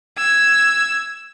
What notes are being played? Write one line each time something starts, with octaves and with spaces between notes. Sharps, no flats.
E6 G#6